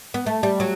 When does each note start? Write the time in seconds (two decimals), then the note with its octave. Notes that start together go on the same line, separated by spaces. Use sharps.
0.14 B3
0.26 A3
0.43 G3
0.60 F#3